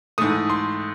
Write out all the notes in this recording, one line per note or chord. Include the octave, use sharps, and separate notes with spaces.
G#2 E3 A3 D#6
C6